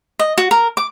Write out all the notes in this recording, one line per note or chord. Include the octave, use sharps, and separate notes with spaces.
D#5
F#4
A#4
D6